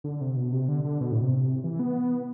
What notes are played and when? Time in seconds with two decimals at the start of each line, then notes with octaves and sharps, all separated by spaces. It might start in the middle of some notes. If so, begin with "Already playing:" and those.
0.04 D3
0.21 C3
0.36 B2
0.53 C3
0.68 D3
0.85 D3
1.01 B2
1.11 A2
1.22 C3
1.64 E3
1.80 B3